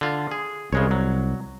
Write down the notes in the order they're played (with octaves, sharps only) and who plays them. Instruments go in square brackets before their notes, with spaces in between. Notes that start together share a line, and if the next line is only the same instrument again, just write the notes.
[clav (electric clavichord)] D3 F4
G#4
[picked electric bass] C2 [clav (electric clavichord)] C#3 G#3 C#5
[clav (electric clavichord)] F#3